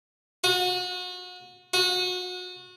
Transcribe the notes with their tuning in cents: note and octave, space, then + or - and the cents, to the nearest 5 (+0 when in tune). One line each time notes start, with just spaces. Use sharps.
F#4 -35
F#4 -30